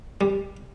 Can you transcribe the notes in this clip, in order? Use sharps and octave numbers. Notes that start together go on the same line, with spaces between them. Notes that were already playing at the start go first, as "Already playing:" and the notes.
G3